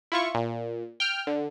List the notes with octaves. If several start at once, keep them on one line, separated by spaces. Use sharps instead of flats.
E4 F4 C#6
A#2
G5 F6
D3